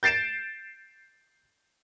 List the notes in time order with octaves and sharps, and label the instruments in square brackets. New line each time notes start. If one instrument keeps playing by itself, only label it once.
[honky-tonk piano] G6 A6 C7 D7 E7